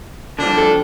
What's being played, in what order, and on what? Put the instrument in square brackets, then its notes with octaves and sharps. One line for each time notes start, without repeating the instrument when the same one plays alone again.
[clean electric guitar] D3 F3 G3 [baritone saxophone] D4
[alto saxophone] A4